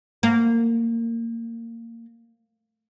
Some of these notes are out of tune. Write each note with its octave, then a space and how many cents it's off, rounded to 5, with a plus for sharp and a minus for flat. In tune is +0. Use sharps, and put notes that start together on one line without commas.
A#3 -20